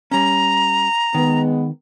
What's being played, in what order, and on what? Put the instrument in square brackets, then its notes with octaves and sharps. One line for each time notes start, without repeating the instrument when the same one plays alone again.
[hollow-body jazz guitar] G3 C#4 [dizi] A#5
[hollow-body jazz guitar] D#3 [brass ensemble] G#3 B3